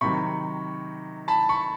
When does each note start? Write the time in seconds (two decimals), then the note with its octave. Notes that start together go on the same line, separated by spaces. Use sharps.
0.01 C3 D#3 F#3 B5 C#6
1.28 A5 B5
1.49 B5 C#6